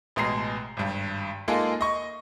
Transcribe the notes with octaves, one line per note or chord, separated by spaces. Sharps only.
A1 B2 G#3 A#5 C7
G#1 G2
G#3 A#3 D#4 F4 G#4 A4
D#5 C#6